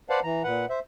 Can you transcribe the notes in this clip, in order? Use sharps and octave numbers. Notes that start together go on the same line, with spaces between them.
B4 C5 D5 F5 F#5 A5
E3 A#5
A#2 B4 F#5
C5 E5